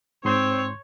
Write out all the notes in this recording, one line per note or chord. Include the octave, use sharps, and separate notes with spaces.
G#2 C4 C#5 C6 G6